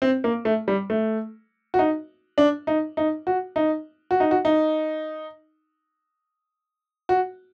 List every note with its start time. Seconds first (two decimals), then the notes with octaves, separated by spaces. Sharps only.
0.02 C4
0.24 A#3
0.45 A3
0.68 G3
0.90 A3
1.74 F#4
1.79 D#4
2.38 D4
2.67 D#4
2.97 D#4
3.27 F#4
3.56 D#4
4.11 F#4
4.20 D#4
4.31 F#4
4.45 D#4
7.09 F#4